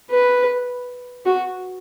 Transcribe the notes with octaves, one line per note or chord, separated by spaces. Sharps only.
B4
F#4